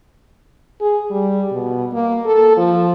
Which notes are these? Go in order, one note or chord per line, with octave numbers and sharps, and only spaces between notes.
G#4
G3
B2
A#3
A4
F3